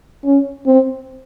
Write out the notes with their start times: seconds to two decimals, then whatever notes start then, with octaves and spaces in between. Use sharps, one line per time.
0.25 C#4
0.66 C4